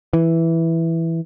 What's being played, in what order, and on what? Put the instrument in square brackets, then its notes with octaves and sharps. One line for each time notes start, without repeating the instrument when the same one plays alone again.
[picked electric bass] E3